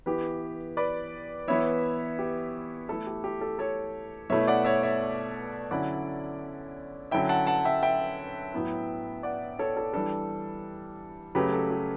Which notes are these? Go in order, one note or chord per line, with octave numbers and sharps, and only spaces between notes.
E3 B3 E4 G4 B4
B4 D5
E3 B3 E4 C#5 E5
G4
E3 A3 E4 A4
G4
G4
A4
A4 C#5
B2 A3 E4 C#5 E5
D5 F#5
C#5 E5
C#5 E5
D3 F#3 C#4 E4 D5 F#5
D3 F#3 C#4 E4 E5 G5
F#5 A5
F#5 A5
E5 G5
E5 G5
A2 F#3 B3 E4
D5 F#5
A4 C#5
A4
E3 G3 D4 A4
C#3 F#3 A3 G4 B4
A4
G4